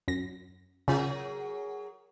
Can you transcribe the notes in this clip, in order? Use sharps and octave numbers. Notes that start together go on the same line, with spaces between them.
F#2 A#6
C#3 F#3 F4 G#4 A#4